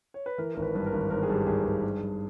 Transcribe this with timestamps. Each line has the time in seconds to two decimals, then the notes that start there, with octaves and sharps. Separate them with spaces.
0.14 C#5
0.26 B4
0.38 E3 A#4
0.55 G#1 A#4
0.62 B4
0.75 G2 B4
0.86 A#4
0.92 G#1
1.10 G#1 A#4
1.23 G#4
1.30 G2 G4
1.47 G#1 G#4
1.65 G#1
1.84 G2
2.01 G2